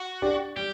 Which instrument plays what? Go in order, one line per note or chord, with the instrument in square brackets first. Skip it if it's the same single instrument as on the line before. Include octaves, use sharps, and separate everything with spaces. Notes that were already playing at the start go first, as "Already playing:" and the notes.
Already playing: [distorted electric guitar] F#4
[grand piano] D4 G4 D5
[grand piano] G3 [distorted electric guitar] G4